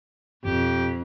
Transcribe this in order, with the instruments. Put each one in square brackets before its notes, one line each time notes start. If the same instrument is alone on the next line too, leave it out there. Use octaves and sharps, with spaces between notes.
[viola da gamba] F2 [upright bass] B2 [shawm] G4